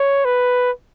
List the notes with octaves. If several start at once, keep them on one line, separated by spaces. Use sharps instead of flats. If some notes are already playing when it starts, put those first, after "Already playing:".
Already playing: C#5
B4